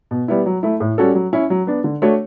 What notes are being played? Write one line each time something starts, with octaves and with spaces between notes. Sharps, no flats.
B2
G3 B3 E4
F#3
A3 E4
A2
G3 C#4 F#4 A4
F#3
C#4 E4
F#3
B3 D4
D3
A3 D4 F#4 C#5